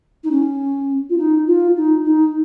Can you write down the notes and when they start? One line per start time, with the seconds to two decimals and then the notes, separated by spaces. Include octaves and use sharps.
0.23 D#4
0.31 C#4
1.09 F4
1.18 D#4
1.47 F4
1.76 D#4
2.04 D#4